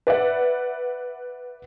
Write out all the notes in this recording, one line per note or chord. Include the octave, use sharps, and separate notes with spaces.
B4 D5 E5 F#5